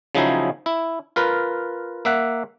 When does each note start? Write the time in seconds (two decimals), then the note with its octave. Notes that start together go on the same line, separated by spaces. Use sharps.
0.15 C#3 F3 F#3 D#4 E4 G#4
0.66 E4
1.16 F4 A#4 B4
2.05 A#3 E5 F#5